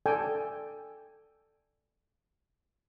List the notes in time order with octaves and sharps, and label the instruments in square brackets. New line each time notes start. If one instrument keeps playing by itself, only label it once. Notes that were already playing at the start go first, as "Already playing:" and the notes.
[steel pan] A4 D5 G5 G#5